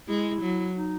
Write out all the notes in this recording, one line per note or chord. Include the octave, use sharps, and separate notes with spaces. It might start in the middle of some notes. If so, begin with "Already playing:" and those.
G#3 E4
F#3
D#4